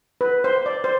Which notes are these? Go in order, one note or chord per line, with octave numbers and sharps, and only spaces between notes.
B4
C5
D5
C5